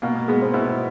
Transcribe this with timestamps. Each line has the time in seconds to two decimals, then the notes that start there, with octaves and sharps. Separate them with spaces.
0.02 B2 A#3
0.15 A#3
0.28 G#3 B3
0.41 C4
0.54 B2 E4